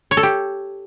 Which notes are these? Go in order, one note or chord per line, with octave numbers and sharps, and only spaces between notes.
C#5
A4
G4